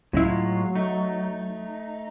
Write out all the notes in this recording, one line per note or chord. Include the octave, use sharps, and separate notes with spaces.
C#2 A2 F#3 G#3 E4 F4
A3 D#4